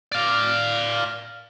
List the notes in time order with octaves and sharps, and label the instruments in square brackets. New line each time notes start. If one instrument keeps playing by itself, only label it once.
[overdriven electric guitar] D5 F5